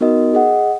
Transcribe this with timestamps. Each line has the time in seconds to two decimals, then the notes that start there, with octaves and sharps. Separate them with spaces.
0.01 B3 D#4 F#4 A#4 D#5
0.34 G#4 D#5 F#5